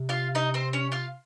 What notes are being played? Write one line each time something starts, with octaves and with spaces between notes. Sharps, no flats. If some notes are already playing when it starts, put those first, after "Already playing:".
Already playing: C3
F4 F5
D#4 D#5
C4 C5
C#4 C#5
F4 F5